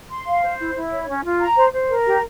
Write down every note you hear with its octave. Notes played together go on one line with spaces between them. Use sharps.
C6
F5
C5
E4
E4
C#5
C#4
F4
A#5
C5
C5
A#4
G4